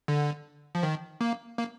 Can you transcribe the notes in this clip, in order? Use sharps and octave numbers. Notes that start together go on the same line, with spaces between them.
D3
F3
D#3
A#3
A#3